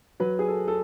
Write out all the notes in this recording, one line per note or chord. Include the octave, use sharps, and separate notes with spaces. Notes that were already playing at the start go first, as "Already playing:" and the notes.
F#3 B4
G#4
A4
A4